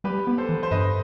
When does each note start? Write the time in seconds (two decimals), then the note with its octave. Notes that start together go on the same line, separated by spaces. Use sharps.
0.04 G3 G4 B4
0.27 B3
0.38 A4 C5
0.49 E3
0.63 C5
0.71 G2 B4 D#5